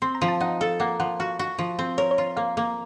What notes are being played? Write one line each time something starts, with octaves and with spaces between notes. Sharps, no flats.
C4 C6
A#5
F3
A5
D#4 F#5
A4 F5
A#3 F#5
F3 F#5
F#4 F5
F#4
F3
C4
A#4 C#5
C#5
F4
A#3 F5
A#3